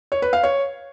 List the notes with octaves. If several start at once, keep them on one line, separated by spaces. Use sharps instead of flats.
C#5
B4
F5
C#5